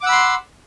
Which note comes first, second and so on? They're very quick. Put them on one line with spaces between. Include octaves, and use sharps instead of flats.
D6 F#5 E6 B5 C6